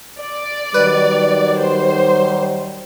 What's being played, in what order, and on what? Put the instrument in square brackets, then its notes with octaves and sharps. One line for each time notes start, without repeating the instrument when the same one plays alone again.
[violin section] D5
[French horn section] D#3 F#3 G3 [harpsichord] B4
[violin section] C5